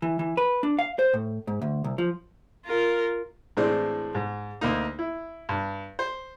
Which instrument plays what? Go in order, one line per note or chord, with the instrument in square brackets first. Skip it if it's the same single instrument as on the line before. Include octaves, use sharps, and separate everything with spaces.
[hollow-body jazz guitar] E3
E3
B4
D4
F5
C5
A2
G#2
D2
C2
F3
[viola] F4 A#4
[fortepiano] A2 E3 G#3 C4 D4
G#2
D2 A#3 D#4
E4
G2
C5